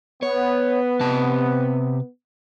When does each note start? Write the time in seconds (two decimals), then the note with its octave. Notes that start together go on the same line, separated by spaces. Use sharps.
0.23 B3 C#5
1.00 C3 A5